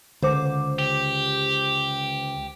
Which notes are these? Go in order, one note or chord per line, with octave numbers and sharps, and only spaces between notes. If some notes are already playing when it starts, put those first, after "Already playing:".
C#2 D3 C5 D6
G4